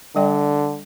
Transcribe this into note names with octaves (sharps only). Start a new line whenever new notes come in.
D3 G3 D5 G5